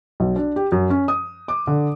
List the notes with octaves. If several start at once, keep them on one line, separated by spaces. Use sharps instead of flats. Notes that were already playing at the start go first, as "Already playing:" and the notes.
B1
D4
G4
F#2
C#4
D#6
D6
D3